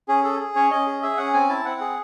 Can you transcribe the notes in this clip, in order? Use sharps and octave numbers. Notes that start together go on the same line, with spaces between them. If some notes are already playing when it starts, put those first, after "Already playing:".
C#4 G#4
G#4 A4
G#4
C#4 C#5
C#4 D#5
G#4
G#4 E5
C#4 F#5
C4 G#5
E4 A5
C4 F#5
G#4